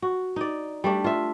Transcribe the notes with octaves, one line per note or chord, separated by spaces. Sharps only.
F#4
D#4 D5
G3 A3 D4
F4 E5